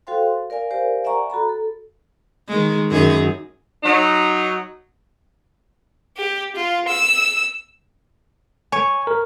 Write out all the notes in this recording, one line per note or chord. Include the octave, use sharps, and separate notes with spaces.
F#4 A4 C5 F5 G5 C6
A#4 D5 F5 G#5
G4 A#4 C5 D5 F5 G#5
D5 E5 F#5 G#5 A#5 C#6
F#4 A4 A#5 B5
A4
D#3 G#3
F#2 D#3 G#4
F#3 D#4
G4
F4
E6
C#5 G#5
A#4